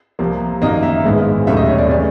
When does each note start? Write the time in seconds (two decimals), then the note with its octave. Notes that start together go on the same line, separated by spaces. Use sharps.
0.19 C2 C3 F3 A#3
0.62 F#2 D#3 F#3 A#3 D#5
0.83 E5
1.04 A#1 G#2 D#3 G#3 B3
1.46 E1 D#2 C#3 F#3 A3 E5
1.57 D#5
1.68 C#5
1.78 D5
1.89 C#3 E3 A3